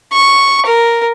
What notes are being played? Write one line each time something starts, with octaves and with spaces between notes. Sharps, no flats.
C#6
A#4